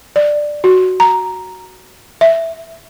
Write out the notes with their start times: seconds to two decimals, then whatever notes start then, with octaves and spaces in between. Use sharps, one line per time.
0.16 D5
0.64 F#4
1.00 A#5
2.21 E5